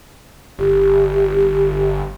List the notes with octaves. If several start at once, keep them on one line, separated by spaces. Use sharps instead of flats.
G1 G4